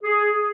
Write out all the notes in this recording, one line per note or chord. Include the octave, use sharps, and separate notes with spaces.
G#4